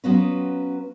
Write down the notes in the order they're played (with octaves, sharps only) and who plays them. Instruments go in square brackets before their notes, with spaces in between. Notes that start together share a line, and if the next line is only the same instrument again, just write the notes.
[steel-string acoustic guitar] F#3 B3 C#4 F4 F#4 B4